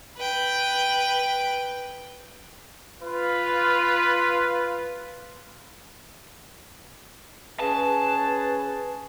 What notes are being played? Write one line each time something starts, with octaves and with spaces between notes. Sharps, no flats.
B4 G5
F4 B4
C#4 G#4 B4 A5